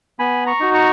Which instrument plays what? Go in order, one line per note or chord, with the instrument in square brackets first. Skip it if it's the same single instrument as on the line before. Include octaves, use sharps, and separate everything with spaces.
[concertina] B3 G#5 B5
A#5 C#6
D#4 F#4
A#5 C#6